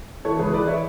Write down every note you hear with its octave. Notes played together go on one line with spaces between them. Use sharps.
E3 A4 C#5
C#2 G#4 B4
E3 B4 D5
C#5 E5